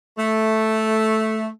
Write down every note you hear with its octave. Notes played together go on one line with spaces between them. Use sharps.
A3